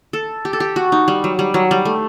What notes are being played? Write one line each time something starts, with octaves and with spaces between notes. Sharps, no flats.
A4
G4
A4
G4
F#4
D#4
G3
F#3
G3
F#3
G3
A3